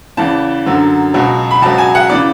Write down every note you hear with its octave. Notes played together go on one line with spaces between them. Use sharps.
E2 C#3 E3 A5
F#2 D3 F#3
C#2 B2 F#3
B5
C#2 B2 F#3 A5
G#5
F#5
C#3 E3 D5